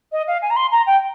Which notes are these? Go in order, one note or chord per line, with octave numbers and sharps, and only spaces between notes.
D#5
F5
G#5
A#5
C6
A#5
G5